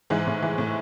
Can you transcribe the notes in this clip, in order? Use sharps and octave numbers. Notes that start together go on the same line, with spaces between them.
G#2 E3 G#3
A2
E3
A2